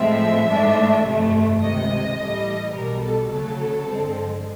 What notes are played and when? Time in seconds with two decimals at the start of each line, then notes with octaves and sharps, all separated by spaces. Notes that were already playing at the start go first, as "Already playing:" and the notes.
Already playing: A2 F3 G#3 C4 E5
0.49 G#2 E3 A3 D4
1.05 G1 F2 C3 E3 A3
1.61 C#2 C3 D#3 D#5
2.19 A2 E3 G3
2.74 B1 B2 G3 A#4
3.03 A4
3.30 D2 C#3 F#3 A4
3.88 G2 D3 F3 G#3 C4